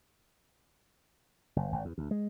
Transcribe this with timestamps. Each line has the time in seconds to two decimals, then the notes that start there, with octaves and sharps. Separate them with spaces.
1.56 F#1
1.72 G#1
1.85 E2
1.98 D2
2.11 G#3